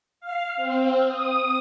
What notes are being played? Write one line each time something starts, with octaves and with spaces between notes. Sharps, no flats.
F5
C4
D#6